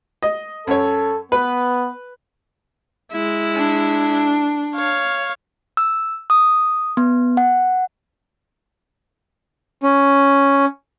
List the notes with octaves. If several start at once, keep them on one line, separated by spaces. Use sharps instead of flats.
D#5
F#2 A4 C#5
B3 B4
G#3 E4
D4
C#5 F5
E6
D#6
B3
F#5
C#4